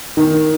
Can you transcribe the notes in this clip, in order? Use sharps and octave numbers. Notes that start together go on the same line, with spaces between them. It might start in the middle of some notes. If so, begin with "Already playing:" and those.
D#3